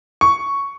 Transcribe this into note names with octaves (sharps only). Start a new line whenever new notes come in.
C#6